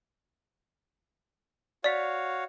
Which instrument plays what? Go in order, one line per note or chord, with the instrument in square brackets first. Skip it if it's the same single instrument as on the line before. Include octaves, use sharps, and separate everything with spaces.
[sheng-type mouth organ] F#4 C#5 F5 [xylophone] D5 B6